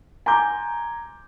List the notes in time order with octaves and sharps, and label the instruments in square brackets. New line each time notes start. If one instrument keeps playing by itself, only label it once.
[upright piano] G#5 A#5 C6 D6 G6